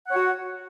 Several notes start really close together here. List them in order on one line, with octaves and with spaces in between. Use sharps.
F#5 C#5 F#4